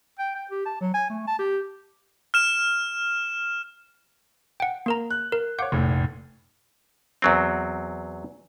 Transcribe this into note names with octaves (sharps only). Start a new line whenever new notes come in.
G5
G5
G4
A5
F#3
G#5
A3
A5
G4
F6 E7
F#5 G5
A#3 A#4 A#5
F#6
A#4
C#5 F5 F#5 D6 G6
F1 A#1 A2
E2 F#3 C4